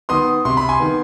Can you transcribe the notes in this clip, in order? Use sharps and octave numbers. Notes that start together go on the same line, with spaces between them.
D#3 B3 C6 D#6
C3 C6
B5
G#5 C6
D#3 B3